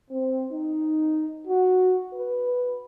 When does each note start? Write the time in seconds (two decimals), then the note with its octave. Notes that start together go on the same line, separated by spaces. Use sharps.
0.11 C4
0.52 D#4
1.47 F#4
2.14 B4